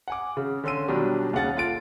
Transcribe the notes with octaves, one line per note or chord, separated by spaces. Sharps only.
F#5 G#5 D6
C#3
D3 C#4 C6 E6 D#7
B2 D#3 F#3 G3 D4
D#2 C#3 F#5 A6
F4 A4 A6 D7